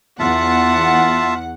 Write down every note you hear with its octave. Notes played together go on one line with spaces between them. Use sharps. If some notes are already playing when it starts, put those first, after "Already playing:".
E2 F4 E5 F#5 A5